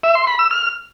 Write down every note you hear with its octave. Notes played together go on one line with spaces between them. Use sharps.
E5
C6
B5
E6
F6